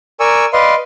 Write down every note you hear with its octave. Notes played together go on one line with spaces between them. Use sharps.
A#4 D5 G#5 C#6 E6
B4 D5 D#5 F5 C6